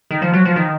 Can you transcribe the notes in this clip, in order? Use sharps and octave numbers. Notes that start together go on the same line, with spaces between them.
D#3
F3
F#3
F3
D#3